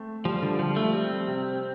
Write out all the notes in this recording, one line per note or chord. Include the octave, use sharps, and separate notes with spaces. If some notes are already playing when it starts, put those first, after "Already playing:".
Already playing: A3 C4
F3 G3
D3
F3 G3
A3
G3 C4
C3